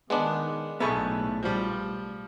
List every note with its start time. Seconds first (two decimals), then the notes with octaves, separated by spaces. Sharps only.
0.10 D#3 G#3 B3 D4
0.80 B1 A2 B3 G#4 A4 E5 B5 C#6
1.43 F3 G3